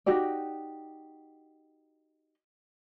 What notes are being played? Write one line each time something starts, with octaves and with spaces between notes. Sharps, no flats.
D#4 F#4 G4 D5